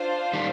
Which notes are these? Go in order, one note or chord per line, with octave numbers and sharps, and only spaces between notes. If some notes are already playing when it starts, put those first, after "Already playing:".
Already playing: D4 F4 C5
D#3 G3